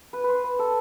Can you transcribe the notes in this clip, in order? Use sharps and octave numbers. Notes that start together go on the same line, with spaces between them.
B4
B4 C5
B4
A4